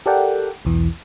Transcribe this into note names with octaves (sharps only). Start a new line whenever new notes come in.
G4 A4 A#4 D5 F#5 G5
B1 E2 E3